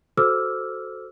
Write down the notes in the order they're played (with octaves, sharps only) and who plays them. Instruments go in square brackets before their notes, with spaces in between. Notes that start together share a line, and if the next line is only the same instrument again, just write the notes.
[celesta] F#4 A4 C5 D6 E6 F6